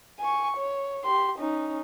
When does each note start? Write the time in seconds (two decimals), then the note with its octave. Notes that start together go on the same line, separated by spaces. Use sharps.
0.20 G#5 C#6
0.57 C#5
1.05 G4 C6
1.39 C#4 D#4